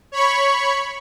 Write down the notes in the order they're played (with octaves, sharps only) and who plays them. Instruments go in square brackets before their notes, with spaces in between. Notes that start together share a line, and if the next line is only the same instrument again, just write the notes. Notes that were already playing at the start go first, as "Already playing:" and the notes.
[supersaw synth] C#5 B5 C#6